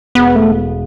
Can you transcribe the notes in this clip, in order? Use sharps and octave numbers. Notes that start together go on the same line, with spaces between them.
E1 B3
A3